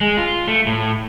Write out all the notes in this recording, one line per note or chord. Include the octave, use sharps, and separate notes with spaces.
G#3
F4
A3
A2